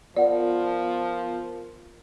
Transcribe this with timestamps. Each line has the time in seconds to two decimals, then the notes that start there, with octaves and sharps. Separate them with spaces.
0.17 F3 B3 F4 A#4 D5 F#5